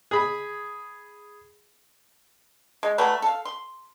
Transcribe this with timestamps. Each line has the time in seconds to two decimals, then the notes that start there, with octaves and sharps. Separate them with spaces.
0.11 G#4 B5
2.83 G#3
2.98 F#3 G3 A3 B4
3.22 A4 F5
3.45 C6